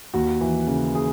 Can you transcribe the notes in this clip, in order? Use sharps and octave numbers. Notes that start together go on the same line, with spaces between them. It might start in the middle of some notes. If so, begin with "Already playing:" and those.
D#2 F#4
E3
C#3
G#4